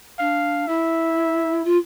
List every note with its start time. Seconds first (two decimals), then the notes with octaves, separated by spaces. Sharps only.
0.19 D4 F5
0.67 E4 E5
1.64 F4